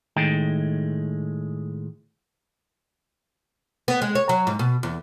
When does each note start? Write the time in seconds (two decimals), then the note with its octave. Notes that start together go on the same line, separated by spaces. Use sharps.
0.16 A2 D#3 G#3 G5
3.88 B3
4.02 G#3
4.15 C#5
4.29 F#3
4.47 G#2
4.59 B2
4.83 E2